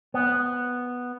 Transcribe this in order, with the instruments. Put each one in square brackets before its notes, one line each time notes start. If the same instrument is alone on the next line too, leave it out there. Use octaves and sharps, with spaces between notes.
[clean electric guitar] B3